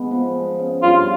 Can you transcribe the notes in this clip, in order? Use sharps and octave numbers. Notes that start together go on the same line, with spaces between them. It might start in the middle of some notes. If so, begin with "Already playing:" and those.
Already playing: G#3 B3
F3
G#3
C#3
G2 F4